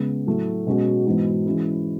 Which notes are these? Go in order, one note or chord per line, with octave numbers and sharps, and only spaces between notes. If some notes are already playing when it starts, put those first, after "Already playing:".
Already playing: C#3 G#3 B3
A2 F#3 A3
B2 G#3 C#4 F#4
G#2 E3 B3 D#4 F#4
E3 G#3 C#4 E4